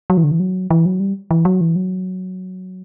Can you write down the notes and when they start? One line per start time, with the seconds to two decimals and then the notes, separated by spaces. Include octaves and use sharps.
0.10 F#3
0.17 E3
0.24 D3
0.31 E3
0.40 F#3
0.70 E3
0.86 F#3
1.00 G3
1.31 E3
1.45 F#3
1.61 E3
1.76 F#3